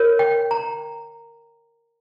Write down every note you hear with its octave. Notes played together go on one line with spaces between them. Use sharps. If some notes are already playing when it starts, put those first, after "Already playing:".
Already playing: F4 A#4 C#5
G5
A#5